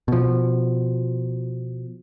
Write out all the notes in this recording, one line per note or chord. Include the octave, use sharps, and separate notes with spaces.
B2 F3